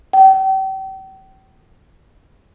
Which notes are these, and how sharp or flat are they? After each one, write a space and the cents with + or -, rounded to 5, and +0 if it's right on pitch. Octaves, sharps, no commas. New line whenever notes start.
G5 -35